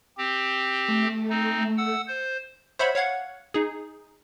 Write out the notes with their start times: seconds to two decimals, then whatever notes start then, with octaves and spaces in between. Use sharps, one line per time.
0.18 C4 G4
0.88 A3
1.30 C4 D#4
1.78 F#5 E6
2.08 C5
2.79 C5 C#5 E5 F#5 B5
2.95 C#5 F5 F#5 G#6
3.54 D#4 G#4